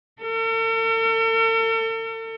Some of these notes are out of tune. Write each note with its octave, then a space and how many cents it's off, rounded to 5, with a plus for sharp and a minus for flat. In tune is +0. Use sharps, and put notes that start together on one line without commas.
A4 +45